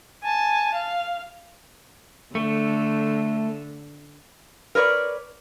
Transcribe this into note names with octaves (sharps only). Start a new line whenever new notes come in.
G#5 A5
F5
D3 A3
A#4 B4 C#5 D5